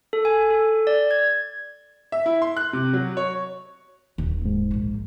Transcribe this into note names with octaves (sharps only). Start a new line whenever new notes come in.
A4
G#5
A4
D5
G#6
E5
E4
C6
F#6
C3
F#3
C#5
D#1 D#2
G#2
A#1 A#3